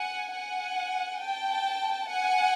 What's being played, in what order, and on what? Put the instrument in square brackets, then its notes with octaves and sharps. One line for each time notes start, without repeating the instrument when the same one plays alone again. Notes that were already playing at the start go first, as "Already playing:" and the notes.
Already playing: [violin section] F#5 G#5
F#5 G#5
G5 A5
F#5 G#5